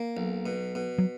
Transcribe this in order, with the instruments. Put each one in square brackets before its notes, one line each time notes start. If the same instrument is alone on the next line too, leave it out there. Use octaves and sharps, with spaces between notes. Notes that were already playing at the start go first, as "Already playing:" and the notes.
Already playing: [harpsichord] A#3
B1
B2
B2
[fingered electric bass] F#3